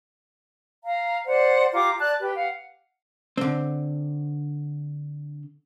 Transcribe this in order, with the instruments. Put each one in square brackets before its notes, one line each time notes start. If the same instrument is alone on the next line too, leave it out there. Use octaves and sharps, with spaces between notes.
[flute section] F5 A#5
C5 D5 F#5
F4 G4 A#5 D6
D5 A5 F#6
G4 B4
F5 F#5
[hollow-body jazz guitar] D3 C4